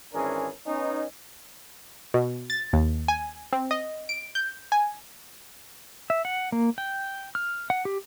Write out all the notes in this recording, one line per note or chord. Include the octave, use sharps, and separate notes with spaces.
G#1 E3 C#4 D4 G#4 A#4
B3 C#4 D#4
B2
A6
D#2
G#5
C4
D#5
D7
G6
G#5
E5
F#5
A#3
G5
F6
F#5
G4